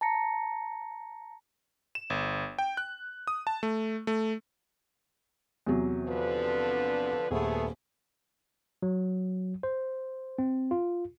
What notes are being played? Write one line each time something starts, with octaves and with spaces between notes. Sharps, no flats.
A5 A#5 A#6 C#7
E7
G1
G5
F#6
D#6
A5
A3
A3
E2 C3 F#3
D3 F3 B4
D#1 A3 B3 G#4
F#3
C5
C4
F4